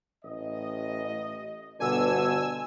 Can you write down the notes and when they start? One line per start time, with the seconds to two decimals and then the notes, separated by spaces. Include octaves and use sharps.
0.24 A1 D#5
1.80 G1 B2 D3 G#5 E6